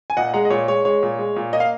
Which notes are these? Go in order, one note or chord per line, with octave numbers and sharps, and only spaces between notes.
G#5
A#2 D#5 F#5
G#3 F#5 A#5
D#5
A#2 C#5
G#3 C#5
G#3 C#5
A#2
G#3
A#2
A#3 D#5
F5